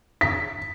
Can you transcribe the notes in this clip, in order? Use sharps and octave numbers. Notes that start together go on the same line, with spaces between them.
B6